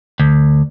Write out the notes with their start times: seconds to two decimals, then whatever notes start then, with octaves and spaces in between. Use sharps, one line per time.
0.20 D2